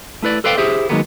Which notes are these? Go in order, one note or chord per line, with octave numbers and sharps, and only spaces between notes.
A3 E4 B4 D5
A4 B4 C5 D5 F5 G5
E4 G4 G#4 C5 E5
D#3 F3 F#3 G#3 A#3 B3